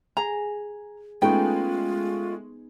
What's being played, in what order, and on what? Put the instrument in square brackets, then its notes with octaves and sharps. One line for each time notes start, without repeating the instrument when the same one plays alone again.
[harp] G#4 [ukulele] A#5
[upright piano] G#3 A3 C#4 [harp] B3 D#4 G#4 [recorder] F4 [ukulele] G5